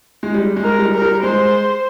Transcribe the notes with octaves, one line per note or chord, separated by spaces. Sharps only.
G#3
G3
G#3
A#4
G3
A#4
G3
G#3 C5